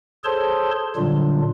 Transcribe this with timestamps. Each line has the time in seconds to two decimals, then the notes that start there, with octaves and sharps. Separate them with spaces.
0.24 G#4 A4 C5 C#5 A5 C6
0.96 A#2 D3 F#3 G3 D4 F4